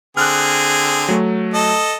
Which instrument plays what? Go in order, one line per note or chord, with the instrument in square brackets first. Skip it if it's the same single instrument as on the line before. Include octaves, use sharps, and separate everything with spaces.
[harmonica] D3 C4 G#4 [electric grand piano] F6 F#6
[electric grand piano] F#3 A3
[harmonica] A4 D#5